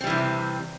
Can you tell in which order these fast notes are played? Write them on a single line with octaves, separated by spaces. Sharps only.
C4 G3 E3 C3